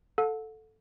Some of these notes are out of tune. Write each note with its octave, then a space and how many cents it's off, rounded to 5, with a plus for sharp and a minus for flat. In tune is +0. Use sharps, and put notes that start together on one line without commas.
A4 +0 F#5 -40